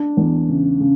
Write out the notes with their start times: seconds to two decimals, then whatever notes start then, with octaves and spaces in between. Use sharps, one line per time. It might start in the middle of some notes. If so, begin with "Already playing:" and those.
Already playing: D4
0.17 E2
0.48 C#3
0.80 C#3